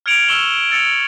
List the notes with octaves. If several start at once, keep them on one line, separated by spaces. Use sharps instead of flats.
F6 G#6 C#7 D7 F7 F#7
C#6 E6 F6 E7 F#7 G7
E6 A6 C#7 F7